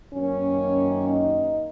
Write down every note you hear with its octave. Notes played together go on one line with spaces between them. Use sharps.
F#2 D#3 A#3 C#4
D#4